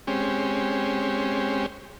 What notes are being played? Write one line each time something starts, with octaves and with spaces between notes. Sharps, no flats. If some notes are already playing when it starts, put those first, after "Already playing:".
G#3 C4 C#4 G4